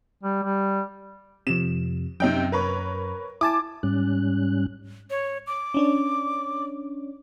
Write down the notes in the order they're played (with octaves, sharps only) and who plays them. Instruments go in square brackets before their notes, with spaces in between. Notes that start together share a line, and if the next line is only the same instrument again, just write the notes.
[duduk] G3
G3
[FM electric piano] F2 C3 [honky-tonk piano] E7
[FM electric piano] F#2 [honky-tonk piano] C3 D#4 G5
[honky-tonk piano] A#4 B4 C#5
[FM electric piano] E4 G#5 A5 [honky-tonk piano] D6
[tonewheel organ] G#2 G3 C#4 F#6
[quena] C#5
D6
[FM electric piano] C#4 D4 C#5